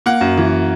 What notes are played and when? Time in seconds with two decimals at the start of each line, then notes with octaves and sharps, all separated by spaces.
0.06 A#3 F#5
0.21 F#2
0.37 E3